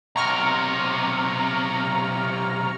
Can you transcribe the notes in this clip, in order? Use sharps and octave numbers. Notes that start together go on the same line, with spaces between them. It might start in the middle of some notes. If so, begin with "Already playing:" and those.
B1 C3 A#5 C#6 F6